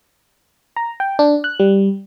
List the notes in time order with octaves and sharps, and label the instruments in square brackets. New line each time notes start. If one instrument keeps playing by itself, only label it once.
[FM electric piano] A#5
G5
D4
F#6
G3